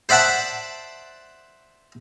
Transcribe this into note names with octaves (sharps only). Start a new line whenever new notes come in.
C5 D5 E5 F#5 A5